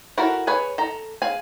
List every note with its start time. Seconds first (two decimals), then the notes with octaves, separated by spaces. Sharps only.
0.18 E4 F#4 A4 A#4
0.47 G#4 B4 C#5 G#5
0.78 A4 A#5
1.22 G#4 F5 G#5